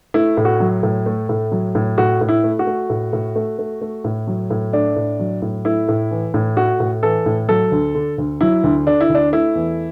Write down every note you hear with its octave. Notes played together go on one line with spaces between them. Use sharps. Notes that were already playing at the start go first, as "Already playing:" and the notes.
A3 E4
A2
F#4
F#3
A2
A3
A2
F#3
A2
A2 F#4
A2
E4
A3
F#4
A3
A2
A2
A3
A3
A3
A2
F#3
A2
A3 D4
A2
F#3
A2
A3 E4
A2
E3
A2
A3 F#4
A2
E3 A4
A2
F#3 A4
D2
D3
D2
F#3 E4
D2
D3 D4
E4
D2
D4
A3 E4
E2